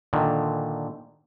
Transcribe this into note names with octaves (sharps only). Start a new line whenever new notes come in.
A#2 D3 D#3